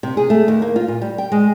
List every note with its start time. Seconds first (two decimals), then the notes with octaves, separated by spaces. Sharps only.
0.03 C3
0.17 G#4
0.30 A3
0.48 D#2
0.62 A#3
0.76 F4
0.88 A#2
1.02 G3
1.18 G5
1.32 G#3